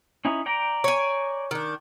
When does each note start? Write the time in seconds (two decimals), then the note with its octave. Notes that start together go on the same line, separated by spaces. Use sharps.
0.25 C#4 D#4 E4
0.46 D5 G5 A#5
0.84 C#5 G#5
1.51 D#3 D4